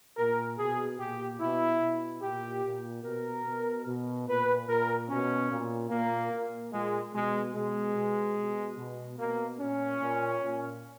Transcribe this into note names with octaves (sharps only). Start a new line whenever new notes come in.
A#2 A#4
B2 G#4
A#2 G4
B2 E4
B2
A#2 G4
A#2
B2 A#4
B2
B2
A#2 B4
A#2 A#4
B2 C#4
A#2
A#2 A#3
A#2
A#2 G#3
B2 G#3
B2 G#3
B2
B2
B2
B2 A#3
A#2 C#4
A#2
A#2